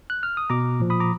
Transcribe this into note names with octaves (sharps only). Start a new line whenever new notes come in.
F#6
F6
D#6
B2 A#5 D6
A#2 F3
B5 D#6
A#5 D6